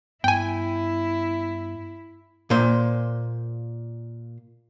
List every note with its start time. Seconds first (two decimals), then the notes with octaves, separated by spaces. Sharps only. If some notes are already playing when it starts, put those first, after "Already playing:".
0.24 G2 B3 E4 G5 G#5
2.50 A#2 C5